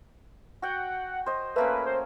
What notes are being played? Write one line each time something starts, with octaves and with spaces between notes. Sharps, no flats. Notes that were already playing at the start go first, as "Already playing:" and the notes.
F#4 F#5 G5
C5 D#5
A3 A#3 C#4 B4
C5